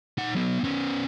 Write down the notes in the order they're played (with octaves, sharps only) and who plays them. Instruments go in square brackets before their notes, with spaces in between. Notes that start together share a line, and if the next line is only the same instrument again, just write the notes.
[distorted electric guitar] D#4 F#5
F#3 B3
B3 C#4